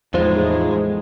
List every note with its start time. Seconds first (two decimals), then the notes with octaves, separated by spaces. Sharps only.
0.14 E2 A2 F3 G#3 D#4 F4 C5